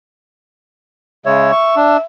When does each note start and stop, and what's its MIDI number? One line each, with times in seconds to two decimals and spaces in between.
1.26 1.52 49
1.26 1.52 56
1.26 1.52 73
1.26 2.03 76
1.52 1.75 85
1.76 1.97 62